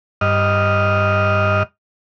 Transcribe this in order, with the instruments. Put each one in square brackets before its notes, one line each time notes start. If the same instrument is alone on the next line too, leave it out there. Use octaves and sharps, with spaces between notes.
[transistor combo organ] G2 D#5 F6